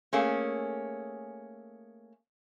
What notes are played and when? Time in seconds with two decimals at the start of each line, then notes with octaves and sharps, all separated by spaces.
0.13 A3 A#3 C#4 G#4